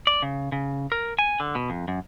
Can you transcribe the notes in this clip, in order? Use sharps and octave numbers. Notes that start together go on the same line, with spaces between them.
D5
C#3
C#3
A#4
G#5
D3
B2
F2
F#2